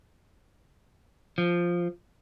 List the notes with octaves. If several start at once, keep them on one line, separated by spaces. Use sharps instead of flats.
F3